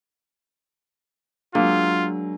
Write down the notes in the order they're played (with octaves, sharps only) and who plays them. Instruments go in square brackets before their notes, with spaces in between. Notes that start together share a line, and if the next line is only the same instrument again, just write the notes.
[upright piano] F#3 G#3 [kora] A#3 [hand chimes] D4 [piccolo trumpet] F4